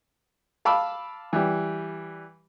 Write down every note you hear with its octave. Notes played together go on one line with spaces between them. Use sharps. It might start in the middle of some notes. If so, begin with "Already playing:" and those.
F5 A5 B5 D6 E6
E3 G3